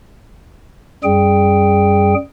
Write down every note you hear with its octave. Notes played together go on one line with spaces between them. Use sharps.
F#2 G3 G#4 G5